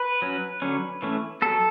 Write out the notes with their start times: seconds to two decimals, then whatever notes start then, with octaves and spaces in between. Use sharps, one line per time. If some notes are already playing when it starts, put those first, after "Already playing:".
Already playing: B4
0.22 F#3 C#4
0.62 D3 F#3 C#4
1.02 E3 A3 C#4
1.42 F#3 B3 A4